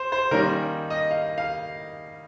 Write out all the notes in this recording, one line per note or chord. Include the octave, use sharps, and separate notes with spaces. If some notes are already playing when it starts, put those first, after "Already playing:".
Already playing: C5
C5
D#3 G3 A#3 C#4 A#4
D#5
F5
F5